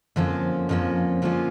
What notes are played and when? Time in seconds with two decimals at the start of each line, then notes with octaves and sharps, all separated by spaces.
0.16 F2 D3 F3 A#3 C#4
0.69 F2 D3 F3 A#3 C#4
1.22 D3 F3 A#3 C#4 F4